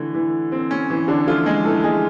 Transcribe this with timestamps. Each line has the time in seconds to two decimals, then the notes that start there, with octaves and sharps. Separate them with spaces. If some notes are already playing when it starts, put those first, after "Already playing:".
Already playing: D3 E3 A3
0.15 E3
0.52 C4
0.71 C#4
0.90 E3
1.08 D3 D4
1.27 F3 A3 F4
1.46 G#3 G#4
1.65 E3 A3 A4
1.84 G#3 G#4